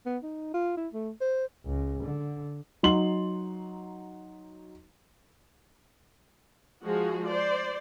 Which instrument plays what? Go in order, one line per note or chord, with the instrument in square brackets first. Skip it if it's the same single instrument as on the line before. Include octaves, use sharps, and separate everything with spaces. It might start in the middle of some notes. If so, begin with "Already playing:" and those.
[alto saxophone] B3
D#4
F4
E4
A3
C5
[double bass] C#2
D3
[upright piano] F#3 D#4 C6 F#7
[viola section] F3 G#3 F#4 G#4
C5 D5